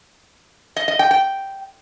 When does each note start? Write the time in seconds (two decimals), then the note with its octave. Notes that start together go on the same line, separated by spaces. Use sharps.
0.76 D#5
0.88 D#5
0.99 G5
1.11 G5